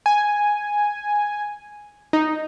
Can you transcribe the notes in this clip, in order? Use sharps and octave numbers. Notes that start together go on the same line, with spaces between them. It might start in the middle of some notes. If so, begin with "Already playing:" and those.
G#5
D#4